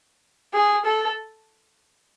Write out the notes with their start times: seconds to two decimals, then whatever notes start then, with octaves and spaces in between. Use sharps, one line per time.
0.54 G#4
0.85 A4